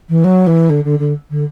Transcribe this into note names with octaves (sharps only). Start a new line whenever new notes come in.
E3
F#3
E3
D3
D3
D3
D3